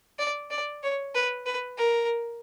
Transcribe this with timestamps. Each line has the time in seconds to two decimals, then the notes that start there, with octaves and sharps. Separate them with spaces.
0.19 D5
0.50 D5
0.83 C#5
1.15 B4
1.46 B4
1.78 A#4